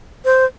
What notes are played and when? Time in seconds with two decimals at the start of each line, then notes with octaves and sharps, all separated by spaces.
0.25 C5